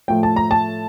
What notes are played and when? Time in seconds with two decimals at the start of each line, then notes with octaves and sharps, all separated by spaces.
0.08 A2 F3 A3 G5
0.23 A5
0.36 A#5
0.51 A5